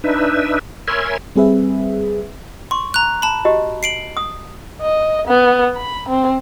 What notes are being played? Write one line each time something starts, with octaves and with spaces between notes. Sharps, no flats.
D4 D#4 B4 E5
A#4 C#5 E5 G#5 B5 C6
G3 C4 G#4 B4 E5
C6 C#6
A#5 F#6
A5 B5
F#4 G4 D#5
C7 D7 F#7
D#6
D#5
B3
B5
C4